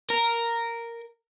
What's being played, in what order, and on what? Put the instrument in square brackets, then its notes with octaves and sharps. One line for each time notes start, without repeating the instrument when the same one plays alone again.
[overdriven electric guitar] A#4